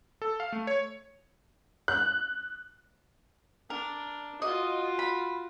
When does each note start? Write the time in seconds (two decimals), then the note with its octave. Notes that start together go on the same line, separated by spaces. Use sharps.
0.22 A4
0.40 F5
0.52 A3
0.67 C#5
1.88 F#6
3.70 D4 A#4
4.42 F4 F#4 D#5
4.99 B5